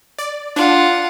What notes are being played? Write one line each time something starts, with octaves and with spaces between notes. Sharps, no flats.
D5
D4 F4 F#5